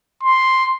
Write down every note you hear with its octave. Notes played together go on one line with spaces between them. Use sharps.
C6